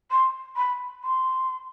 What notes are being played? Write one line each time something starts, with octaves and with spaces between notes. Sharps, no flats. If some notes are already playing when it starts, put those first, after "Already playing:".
C6
B5
C6